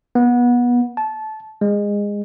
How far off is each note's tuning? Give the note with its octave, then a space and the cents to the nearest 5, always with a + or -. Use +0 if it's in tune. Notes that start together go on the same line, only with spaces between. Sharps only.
B3 -25
A5 -20
G#3 -20